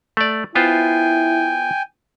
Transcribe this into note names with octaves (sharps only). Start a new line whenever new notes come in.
A3 D5
B3 E4 F4 C5 G5 G#5